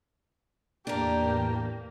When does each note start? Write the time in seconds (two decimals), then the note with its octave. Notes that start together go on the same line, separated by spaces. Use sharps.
0.87 E2 A2 A#3 D4 G4 A#4